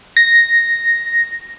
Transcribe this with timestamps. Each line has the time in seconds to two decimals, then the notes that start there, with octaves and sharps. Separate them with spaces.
0.17 A#6